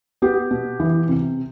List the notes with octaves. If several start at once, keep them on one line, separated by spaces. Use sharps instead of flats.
B3 G4
B2
E3
C3